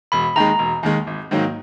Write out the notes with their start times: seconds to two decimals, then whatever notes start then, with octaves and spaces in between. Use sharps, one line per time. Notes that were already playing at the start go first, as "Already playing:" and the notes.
0.12 E1 B5
0.36 D#2 D#3 G#3 A#5
0.59 E1
0.83 D#2 D#3 G#3
1.07 G#1
1.31 G#2 D#3 F#3 A#3